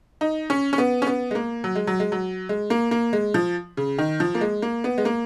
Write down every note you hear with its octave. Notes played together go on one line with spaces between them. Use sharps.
D#4
C#4
C#4
B3
C#4
B3
G#3
A#3
F#3
G#3
F#3
G#3
F#3
G#3
A#3
A#3
G#3
F3
C#3
D#3
F3
A#3
G#3
A#3
B3
G#3
A#3